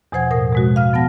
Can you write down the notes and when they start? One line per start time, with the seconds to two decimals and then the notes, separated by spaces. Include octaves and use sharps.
0.12 E2 B2 F3 C5 F#5 G#6
0.31 A2 A#4 D#6
0.53 B2 G#3 F#4
0.76 F5 F6
0.93 F3 B3 F#5 A5 A#6